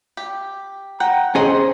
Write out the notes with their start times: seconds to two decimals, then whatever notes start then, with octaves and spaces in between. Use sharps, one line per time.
0.17 G4
1.00 F#5 G5 A#5
1.35 C#4 G#4 C5 D#5